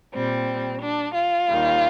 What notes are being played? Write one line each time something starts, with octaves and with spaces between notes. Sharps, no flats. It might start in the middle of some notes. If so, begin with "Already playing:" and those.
A#2 G3 C4
D4
F4
D#2 D#3 G3